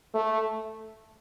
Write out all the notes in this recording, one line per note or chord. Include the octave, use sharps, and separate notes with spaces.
A3